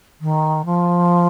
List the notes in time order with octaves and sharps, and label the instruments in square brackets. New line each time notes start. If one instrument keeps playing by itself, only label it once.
[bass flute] D#3
F3